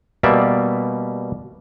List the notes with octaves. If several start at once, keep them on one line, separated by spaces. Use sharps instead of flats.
B2 G3 A#3 D5 E5